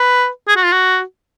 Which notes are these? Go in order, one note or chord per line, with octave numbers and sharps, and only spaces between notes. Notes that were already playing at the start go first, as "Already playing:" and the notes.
Already playing: B4
G#4
F#4
F4
F#4